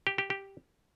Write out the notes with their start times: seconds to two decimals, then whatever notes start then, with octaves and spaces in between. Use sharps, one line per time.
0.07 G4
0.18 G4
0.30 G4